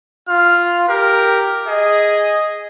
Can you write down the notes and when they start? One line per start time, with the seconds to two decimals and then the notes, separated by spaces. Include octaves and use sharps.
0.29 F4 F6
0.89 G4 A#4
1.67 G#4 D#5